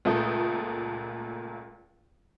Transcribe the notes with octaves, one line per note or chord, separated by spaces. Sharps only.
C#2 A#2 A3 A4 D#6 G6